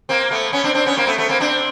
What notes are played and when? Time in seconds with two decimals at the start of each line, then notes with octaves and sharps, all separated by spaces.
0.09 A#3 C4
0.31 A3 B3
0.53 B3 C#4
0.64 C4 D4
0.75 C4 D4
0.86 B3 C#4
0.97 A#3 C4
1.07 A3 B3
1.18 A3 B3
1.29 A#3 C4
1.40 C4 D4